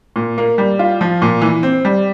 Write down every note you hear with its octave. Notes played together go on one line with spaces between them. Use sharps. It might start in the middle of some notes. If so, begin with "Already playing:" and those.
A#2
A#3
G3
F4
F3
A#2
E3
C4
G3